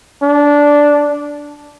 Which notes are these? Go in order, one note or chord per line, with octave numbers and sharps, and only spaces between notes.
D4